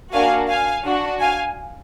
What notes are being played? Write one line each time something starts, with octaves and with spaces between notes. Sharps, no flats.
A#3 D4 F#4 F5 G#5
F5 G#5
D4 F#4
F5 G#5